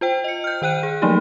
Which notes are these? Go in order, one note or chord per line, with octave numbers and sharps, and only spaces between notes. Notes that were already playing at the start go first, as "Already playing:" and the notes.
F4 C5 G5
D#5 C#7
F6 G6
D#3 C5 G5 F#6 D#7
G#4
F3 F#3 A3 A#3 D#4 G4